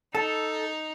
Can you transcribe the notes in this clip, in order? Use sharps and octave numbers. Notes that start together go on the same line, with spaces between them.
D#4 A4 A5